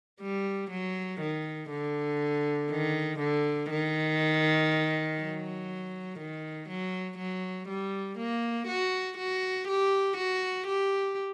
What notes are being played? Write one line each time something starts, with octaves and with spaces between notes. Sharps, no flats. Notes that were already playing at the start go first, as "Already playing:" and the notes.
G3
F#3
D#3
D3
D#3
D3
D#3
F#3
D#3
F#3
F#3
G3
A#3
F#4
F#4
G4
F#4
G4